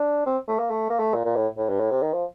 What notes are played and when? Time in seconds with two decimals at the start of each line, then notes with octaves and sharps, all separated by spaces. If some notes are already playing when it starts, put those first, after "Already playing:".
Already playing: D4
0.26 C4
0.48 A3
0.59 A#3
0.71 A3
0.90 A#3
1.00 A3
1.14 A#2
1.25 A#2
1.36 A2
1.58 A2
1.69 G2
1.80 A2
1.91 C3
2.02 D#3
2.14 F3